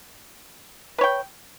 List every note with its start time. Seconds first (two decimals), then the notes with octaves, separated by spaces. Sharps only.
0.98 B4
1.01 C#5
1.04 G5